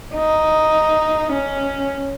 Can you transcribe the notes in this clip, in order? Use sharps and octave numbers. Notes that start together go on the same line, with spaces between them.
D#4
C#4